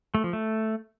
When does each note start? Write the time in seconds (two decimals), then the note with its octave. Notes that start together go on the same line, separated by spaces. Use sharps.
0.15 A3
0.24 F3
0.33 A3